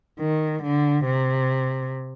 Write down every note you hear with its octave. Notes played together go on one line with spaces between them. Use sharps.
D#3
D3
C3